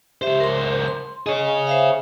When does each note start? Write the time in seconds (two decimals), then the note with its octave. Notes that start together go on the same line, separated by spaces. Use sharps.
0.22 C#2 G4 C5 E5
0.40 A#4 C6
0.88 C6
1.26 G#4 C#5 D#5
1.67 C5 E5 F5